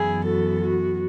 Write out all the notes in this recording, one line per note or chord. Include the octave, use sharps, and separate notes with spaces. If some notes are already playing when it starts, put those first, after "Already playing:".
Already playing: F#2 E3 B3 E4 G#4
F#4 A4
F#4